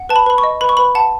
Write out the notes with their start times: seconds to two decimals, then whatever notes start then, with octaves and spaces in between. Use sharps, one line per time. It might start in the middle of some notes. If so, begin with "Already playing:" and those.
Already playing: F#5
0.09 B4 A5
0.16 B5
0.26 B4 B5
0.38 C#6
0.43 D#5
0.61 B4 B5
0.69 C#6
0.77 B4 B5
0.95 F#5 A5